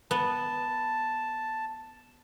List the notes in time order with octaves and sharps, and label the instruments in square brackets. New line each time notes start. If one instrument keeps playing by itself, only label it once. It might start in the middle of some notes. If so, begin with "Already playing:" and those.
[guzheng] B3 [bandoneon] A5